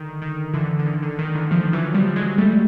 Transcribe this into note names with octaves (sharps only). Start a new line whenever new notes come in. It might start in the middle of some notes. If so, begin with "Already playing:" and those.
Already playing: D3 D#3
D#3
D3 E3
D3
D#3
D3
D#3
D3 E3
D#3 F3
E3 F#3
F3 G3
F#3 G#3
G3 A3